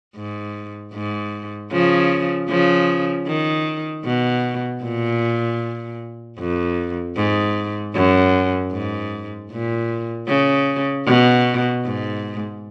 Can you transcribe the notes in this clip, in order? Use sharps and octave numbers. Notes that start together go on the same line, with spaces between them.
G#2
G#2
C#3 F3
C#3 F3
D#3
B2
A#2
F2
G#2
F#2
G#2
A#2
C#3
B2
G#2